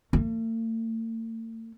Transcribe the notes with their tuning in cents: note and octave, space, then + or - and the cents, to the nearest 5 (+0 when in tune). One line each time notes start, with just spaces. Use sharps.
A3 +45